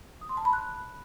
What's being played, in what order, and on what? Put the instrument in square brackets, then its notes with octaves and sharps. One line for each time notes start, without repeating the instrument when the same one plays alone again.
[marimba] D#6
C6
A5
B5
F#6